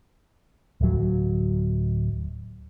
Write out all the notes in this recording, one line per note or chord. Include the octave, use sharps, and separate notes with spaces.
D1 F#3